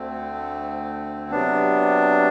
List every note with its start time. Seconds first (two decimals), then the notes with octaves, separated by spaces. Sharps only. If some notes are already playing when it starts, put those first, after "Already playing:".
Already playing: D2 D3 A3 C4
1.31 C3 F#3 B3 D4